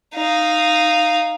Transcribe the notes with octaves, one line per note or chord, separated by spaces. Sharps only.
D#4 F5